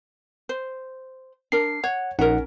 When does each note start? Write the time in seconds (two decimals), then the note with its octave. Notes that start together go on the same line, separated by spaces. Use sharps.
0.49 C5
1.52 D4 A#4 C7
1.84 C#5 F#5
2.19 A#1 C#4 D#4 A#4 F#5